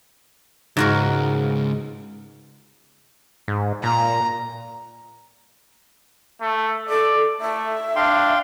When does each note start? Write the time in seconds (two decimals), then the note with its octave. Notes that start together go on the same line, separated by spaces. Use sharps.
0.77 C#2 G#2 F#4 A#4
3.48 G#2
3.83 A#2 A#5
6.41 A3
6.89 A4 D5
7.41 A3 E5
7.96 D4 F5 G5 C6